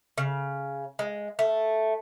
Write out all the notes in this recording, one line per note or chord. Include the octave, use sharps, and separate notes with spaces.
C#3
G#3
A3